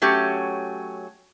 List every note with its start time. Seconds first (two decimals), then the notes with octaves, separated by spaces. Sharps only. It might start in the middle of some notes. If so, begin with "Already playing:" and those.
0.02 F#3 A3 C#4 G4